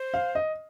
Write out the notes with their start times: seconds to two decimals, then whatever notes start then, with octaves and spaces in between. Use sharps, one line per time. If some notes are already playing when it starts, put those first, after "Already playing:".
Already playing: C5
0.14 F5
0.35 D#5